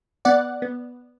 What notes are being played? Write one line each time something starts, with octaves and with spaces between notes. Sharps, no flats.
B3 D5 F#5
B3